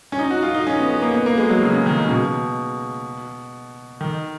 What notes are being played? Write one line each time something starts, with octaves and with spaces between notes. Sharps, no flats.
C#4
D#4
F#4
F4
D#4
C#4
B3
B3
A#3
B3
A#3
G#3
F#3
C#3
C#3
D#3
C#3
B2
D#3